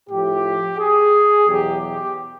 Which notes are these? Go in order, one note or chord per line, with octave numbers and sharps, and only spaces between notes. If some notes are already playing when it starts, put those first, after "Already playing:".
A2 F3 G4
G#4
E2 B2 F#3 G4
G4